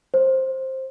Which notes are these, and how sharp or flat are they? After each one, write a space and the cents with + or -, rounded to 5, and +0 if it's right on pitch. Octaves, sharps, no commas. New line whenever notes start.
C5 +10